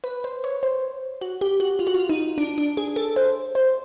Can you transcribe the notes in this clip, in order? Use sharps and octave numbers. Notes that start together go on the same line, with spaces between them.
B4
C5
C#5
C5
F#4
G4
F#4
F4
F#4
F4
D#4
D4
D4
G#4
A4
C5
C5